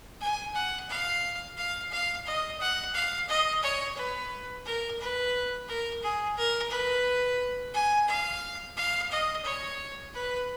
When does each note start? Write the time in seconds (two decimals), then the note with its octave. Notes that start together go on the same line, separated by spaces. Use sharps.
0.21 G#5
0.55 F#5
0.89 F5
1.57 F5
1.92 F5
2.26 D#5
2.60 F#5
2.94 F5
3.29 D#5
3.63 C#5
3.97 B4
4.66 A#4
5.00 B4
5.68 A#4
6.03 G#4
6.37 A#4
6.71 B4
7.74 G#5
8.08 F5
8.77 F5
9.11 D#5
9.45 C#5
10.14 B4